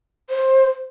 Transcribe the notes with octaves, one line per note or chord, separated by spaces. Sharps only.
C5